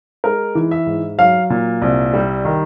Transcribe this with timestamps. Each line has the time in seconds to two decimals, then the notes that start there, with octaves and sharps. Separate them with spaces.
0.24 G#3 A#4
0.55 E3
0.71 E5
0.87 G#2
1.18 F#3 F5
1.50 A#2
1.82 C2
2.13 G3
2.45 D#3